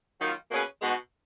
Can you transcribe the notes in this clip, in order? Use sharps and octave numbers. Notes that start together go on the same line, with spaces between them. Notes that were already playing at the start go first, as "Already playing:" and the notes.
D#3 F#3 A#3 F4
B2 A#3 C#4 G#4 B4
B2 G#3 B3 D#4 F#4